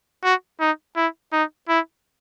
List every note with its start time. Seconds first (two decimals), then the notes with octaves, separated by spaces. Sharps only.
0.24 F#4
0.60 D#4
0.96 E4
1.32 D#4
1.69 E4